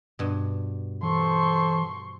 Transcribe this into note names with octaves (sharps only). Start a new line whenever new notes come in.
G2 B2
E3 A4 C5 C6 C#6